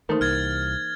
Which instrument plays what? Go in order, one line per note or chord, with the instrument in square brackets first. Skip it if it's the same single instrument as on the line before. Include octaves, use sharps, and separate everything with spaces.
[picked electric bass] D#3 A3 [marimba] E3 A#3 D#4 [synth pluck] A#4 C5
[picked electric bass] C2 [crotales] F6 G#6 A6